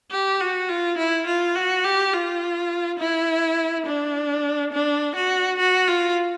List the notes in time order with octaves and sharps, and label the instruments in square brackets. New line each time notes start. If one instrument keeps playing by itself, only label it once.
[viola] G4
F#4
F4
E4
F4
F#4
G4
F4
E4
D4
D4
F#4
F#4
F4